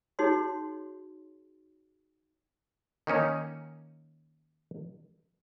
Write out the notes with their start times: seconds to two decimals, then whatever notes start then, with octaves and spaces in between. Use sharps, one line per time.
0.19 D#4 F#4 G#4 C#5 C6
3.07 D#3 A#3 C#4 D#4